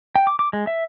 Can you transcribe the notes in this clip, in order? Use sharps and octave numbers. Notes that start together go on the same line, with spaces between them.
G5
D6
D6
G#3
E5